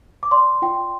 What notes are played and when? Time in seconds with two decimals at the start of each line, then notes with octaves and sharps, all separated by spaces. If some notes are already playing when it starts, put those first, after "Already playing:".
0.23 D6
0.31 D5 C6
0.62 F4 G5